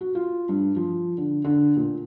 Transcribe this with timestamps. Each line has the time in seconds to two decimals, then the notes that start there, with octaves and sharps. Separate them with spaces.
0.01 F#4
0.15 F4
0.49 G2
0.76 F3
1.18 D3
1.44 D3
1.76 A#2